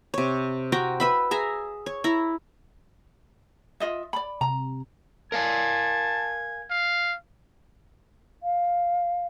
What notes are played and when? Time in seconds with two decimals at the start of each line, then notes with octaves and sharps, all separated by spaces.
0.14 C3 C#5
0.72 C4 F#4 G5 A#5
1.00 B4 E5 B5
1.31 G#4 E5 A#5
1.86 C#5
2.04 E4 A#5
3.80 F4 D#5 E5
4.13 D5 B5
4.41 C3 A#5
5.32 A#4 F5 G#5 A5 G#6
6.70 F5
8.43 F5